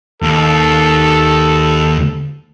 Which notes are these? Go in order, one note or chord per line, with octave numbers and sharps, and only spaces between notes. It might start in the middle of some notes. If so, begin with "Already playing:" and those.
D#2 A4